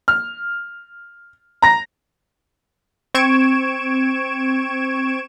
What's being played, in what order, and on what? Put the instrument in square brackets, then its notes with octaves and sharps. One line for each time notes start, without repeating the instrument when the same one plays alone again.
[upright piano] F6
A#5 A#6
[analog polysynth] C4 C#6 G#6 D7 E7